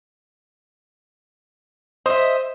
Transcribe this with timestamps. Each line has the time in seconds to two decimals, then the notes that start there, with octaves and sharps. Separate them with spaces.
2.06 C5 D#5 E5